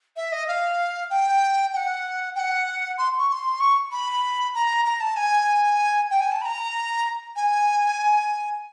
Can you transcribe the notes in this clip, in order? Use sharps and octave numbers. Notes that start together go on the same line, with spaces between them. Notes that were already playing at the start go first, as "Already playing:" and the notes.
E5
D#5
F5
G5
G5
F#5
G5
F#5
C6
C#6
C#6
C6
C#6
B5
A#5
A#5
A5
G#5
G5
G#5
A5
B5
A#5
G#5